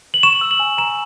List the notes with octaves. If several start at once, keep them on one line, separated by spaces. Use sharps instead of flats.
F#7
C#6 E7
E6
F#7
G#5
A#5 E7